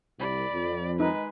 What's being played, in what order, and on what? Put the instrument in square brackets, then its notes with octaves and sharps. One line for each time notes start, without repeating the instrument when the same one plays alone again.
[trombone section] C2 [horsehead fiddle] D5 B5
[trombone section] F2
[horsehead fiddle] G#3 B4 [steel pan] D#4